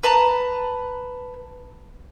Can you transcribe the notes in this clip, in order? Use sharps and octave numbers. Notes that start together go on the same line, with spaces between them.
B4 A5 A#5